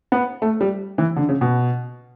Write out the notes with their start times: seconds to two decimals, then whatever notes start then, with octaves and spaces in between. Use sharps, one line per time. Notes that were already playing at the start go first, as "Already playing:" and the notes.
0.12 B3
0.42 A3
0.61 G3
0.98 E3
1.16 D3
1.29 C#3
1.41 B2